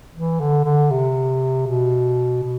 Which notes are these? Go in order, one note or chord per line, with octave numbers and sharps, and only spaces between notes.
E3
D3
D3
C3
B2
B2